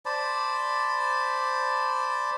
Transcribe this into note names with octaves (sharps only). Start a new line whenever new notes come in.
C5 D5 A5 B5